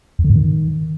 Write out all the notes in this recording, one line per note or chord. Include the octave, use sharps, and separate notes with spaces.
E2
D3
G#2
D#3